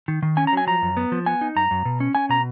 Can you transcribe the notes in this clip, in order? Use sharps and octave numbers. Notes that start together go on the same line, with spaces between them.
D#3
D#3
C#4 G#5
A#5
F#3 G#5
F3 A#5
F#2
B3
F3
B3 G#5
D#4
F#2 A#5
F#2
B2
C#4
C#4 G#5
B2 A#5